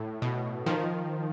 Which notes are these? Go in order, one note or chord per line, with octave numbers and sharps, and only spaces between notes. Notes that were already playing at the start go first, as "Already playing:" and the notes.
Already playing: A2
B2
D#3 F3